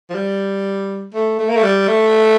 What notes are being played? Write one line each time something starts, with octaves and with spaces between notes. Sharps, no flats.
F3
G3
A3
A3
A#3
A3
G3
A3